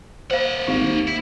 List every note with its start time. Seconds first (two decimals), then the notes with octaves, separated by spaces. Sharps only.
0.31 A#3 C5 F5 F#5
0.67 G#1 G4 F5
0.83 D#2
1.07 E4